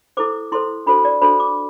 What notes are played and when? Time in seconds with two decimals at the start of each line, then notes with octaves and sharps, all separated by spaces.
0.17 E4 A4 C5 D6
0.52 E4 A4 C5 C6
0.86 D4 F#4 A4 C5 B5
1.05 D5
1.21 D4 F#4 A4 C5 B5
1.40 D6